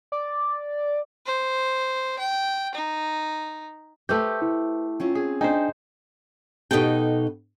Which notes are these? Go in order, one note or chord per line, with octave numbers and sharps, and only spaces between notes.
D5
C5
G5
D#4
A3 G4 B4 C5 G6
E4
C4 C#4 F4
G#4
D4 D#4 C5 G5 G#5
B2 D#4 G4 A4 G5